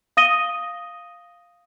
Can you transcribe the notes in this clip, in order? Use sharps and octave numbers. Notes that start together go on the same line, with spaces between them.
F5 D#6 A#6 D#7 G7